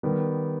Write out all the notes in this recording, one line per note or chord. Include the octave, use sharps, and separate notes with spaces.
D#3 G3 B3